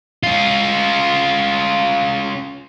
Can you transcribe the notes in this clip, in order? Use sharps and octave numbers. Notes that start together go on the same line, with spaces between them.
C#4 F4